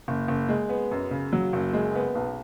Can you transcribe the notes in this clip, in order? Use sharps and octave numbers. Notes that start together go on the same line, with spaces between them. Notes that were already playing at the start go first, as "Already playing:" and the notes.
F#1
F#1
G#3
B3
F#2
C#3
F#3
F#1
G#3
B3
B1